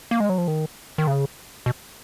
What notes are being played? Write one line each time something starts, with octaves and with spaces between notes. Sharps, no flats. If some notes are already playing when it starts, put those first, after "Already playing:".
A#3
G#3
F#3
F3
D#3
D#3
C#3
B2